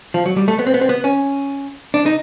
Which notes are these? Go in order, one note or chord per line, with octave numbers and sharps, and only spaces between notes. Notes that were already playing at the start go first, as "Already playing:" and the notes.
F3
F#3
G3
A3
B3
C4
B3
C4
B3
C#4
D4
D#4